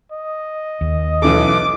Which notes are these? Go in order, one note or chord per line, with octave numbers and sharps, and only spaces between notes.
D#5
D#2
B1 E3 A4 D6